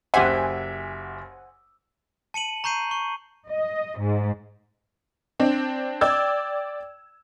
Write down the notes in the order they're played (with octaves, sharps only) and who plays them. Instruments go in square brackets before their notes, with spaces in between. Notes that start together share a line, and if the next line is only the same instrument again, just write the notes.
[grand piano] F#1 G4 E5 [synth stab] C5 F#5 G#5
[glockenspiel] A5 C#7 D#7 F#7
A#5 C#6 G6 C7 D#7
C#6
[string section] D#5
G#2
[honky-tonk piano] C4 D4
D5 G5 E6 G#6